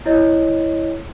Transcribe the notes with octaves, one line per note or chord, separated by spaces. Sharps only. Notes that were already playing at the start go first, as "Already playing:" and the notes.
E4 C#5 D#5